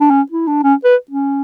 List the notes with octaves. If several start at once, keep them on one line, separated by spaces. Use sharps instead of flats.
D4
C#4
E4
D4
C#4
B4
C#4